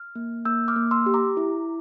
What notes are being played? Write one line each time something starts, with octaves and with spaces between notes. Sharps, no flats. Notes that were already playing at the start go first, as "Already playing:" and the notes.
Already playing: F6
A#3
A#3 E6 G6
D6 F6
A#3
C6 E6
G4
A#5 D6
E4